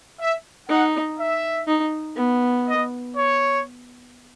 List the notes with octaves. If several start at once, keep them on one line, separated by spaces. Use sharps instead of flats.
E5
D#4 F#5
E5
D#4
B3
D#5
C#5